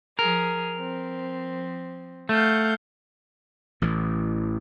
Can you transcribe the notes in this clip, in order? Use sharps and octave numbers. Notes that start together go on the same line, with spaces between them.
F3 G#4 A#4
F3 C4
A3 F5 F#5 G6
A1 A2 E3